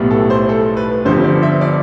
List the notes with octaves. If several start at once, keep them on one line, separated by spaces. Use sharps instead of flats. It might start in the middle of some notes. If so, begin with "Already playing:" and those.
Already playing: B1 A2 G3 B3
A4
C5
A4
B4
G1 G2 D3 F3 C5
D5
E5
D5